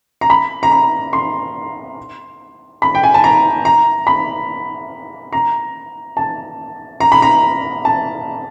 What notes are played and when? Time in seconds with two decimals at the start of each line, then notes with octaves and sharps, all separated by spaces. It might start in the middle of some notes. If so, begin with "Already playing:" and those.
0.21 A#5
0.30 B5
0.63 A#5
0.72 B5
1.13 C6
2.82 B5
2.95 G5
3.04 G#5
3.14 A5
3.24 A#5
3.65 A#5
4.07 B5
5.33 A#5
6.17 A5
7.00 A#5
7.12 B5
7.22 A#5
7.85 A5